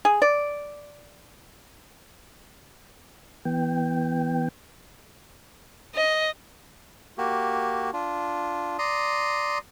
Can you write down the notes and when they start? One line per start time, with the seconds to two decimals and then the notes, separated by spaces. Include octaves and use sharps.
0.05 G#4
0.22 D5
3.45 E3 B3 G5
5.95 D#5
7.18 A#3 F#4 G4
7.93 D4 F4
8.79 D5 A#5 C6 D#6